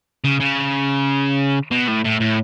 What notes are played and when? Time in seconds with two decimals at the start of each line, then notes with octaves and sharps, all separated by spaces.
0.24 C#3
0.40 C#3
1.71 B2
1.88 A2
2.04 A2
2.20 A2